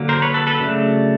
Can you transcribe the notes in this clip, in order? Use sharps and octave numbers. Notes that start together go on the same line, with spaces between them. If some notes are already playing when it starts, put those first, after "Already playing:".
Already playing: D3 F#3 A#3
A#4 C5
B4 C#5
A4 B4
A4 B4
C#3 F#3 A3 D4